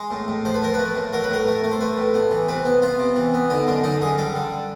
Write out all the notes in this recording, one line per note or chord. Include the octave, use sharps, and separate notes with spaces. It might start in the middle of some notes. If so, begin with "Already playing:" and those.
Already playing: G#3
A2
A2
F3 C5
B4
F3 A#4
A3 B4
A2
F#3 A#4
B4
A2 A#4
A3
A3
C5
A3 B4
A2
B3
E3
C3 B4
B3
B3 F4
C3
E3
B3
D3 D#4
F#2 D4
D3 D#4
F#2 G#4
G3 A4
D3